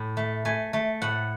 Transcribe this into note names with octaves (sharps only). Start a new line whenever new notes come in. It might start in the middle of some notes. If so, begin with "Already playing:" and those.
Already playing: A2
A3
A3 G#5
A3
A2 F#5